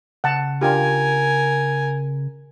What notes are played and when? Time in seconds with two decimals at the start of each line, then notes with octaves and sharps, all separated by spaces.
0.24 C#3 F#5 A5
0.61 D4 F4 G4 A#4 G#5